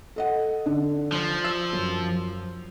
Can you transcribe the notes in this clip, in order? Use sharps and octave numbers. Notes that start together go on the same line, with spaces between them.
A4 D#5 F#5
D3
F3
E6 E7
F#2